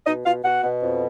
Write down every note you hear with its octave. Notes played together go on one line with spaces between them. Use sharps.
B2 D#4 D#5
B2 F4 F5
B2 F#4 F#5
B2
F2